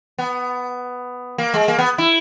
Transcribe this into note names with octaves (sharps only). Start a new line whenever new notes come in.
B3
A#3
G#3
A#3
B3
E4